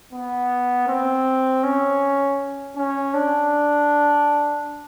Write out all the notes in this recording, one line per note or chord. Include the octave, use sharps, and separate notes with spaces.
B3
C4
C#4
C#4
D4